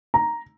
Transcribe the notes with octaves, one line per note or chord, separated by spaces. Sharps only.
A#5